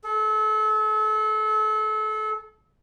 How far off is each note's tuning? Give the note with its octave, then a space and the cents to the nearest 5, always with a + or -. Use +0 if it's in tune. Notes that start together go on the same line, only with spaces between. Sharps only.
A4 -35